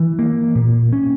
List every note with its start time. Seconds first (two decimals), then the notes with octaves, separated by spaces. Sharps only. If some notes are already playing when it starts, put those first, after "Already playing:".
Already playing: E3
0.19 A#3
0.55 A#2
0.93 C#4